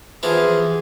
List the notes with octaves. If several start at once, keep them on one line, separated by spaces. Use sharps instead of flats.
E3 F3 B3 G#4